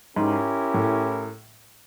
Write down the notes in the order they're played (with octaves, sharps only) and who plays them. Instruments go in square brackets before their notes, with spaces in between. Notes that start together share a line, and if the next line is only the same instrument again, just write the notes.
[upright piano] G#2 [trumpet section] C#4 E4 G4 A#4
[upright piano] A2